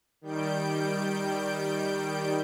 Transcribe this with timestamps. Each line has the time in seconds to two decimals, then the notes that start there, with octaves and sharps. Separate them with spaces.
0.21 D#3 G3 G6 D7